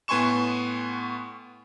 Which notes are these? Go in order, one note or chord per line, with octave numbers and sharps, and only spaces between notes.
A2 B3 G#5 C6 C#6 E7